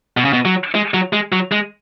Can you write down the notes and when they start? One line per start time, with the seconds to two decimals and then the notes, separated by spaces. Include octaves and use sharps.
0.17 B2
0.25 C#3
0.33 B2
0.45 F#3
0.75 G#3
0.94 F#3
1.13 G#3
1.32 F#3
1.52 G#3